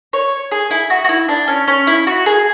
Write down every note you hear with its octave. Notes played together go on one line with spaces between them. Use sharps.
C#5
G#4
E4
F#4
F#4
E4
D4
C#4
C#4
E4
F#4
G#4